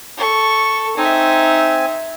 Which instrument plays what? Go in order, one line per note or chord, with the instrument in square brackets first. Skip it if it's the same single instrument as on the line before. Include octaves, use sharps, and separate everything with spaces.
[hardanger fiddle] A4 C#6
[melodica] C4 G#5 [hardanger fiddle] D#4 E5